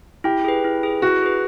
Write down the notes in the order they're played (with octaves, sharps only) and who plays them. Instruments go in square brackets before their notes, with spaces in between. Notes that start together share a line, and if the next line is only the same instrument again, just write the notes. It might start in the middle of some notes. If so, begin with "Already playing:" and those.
[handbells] E4 [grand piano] G4
[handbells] G#4 B4
E4
G#4 B4
[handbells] E4 [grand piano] F#4
[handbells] G#4 B4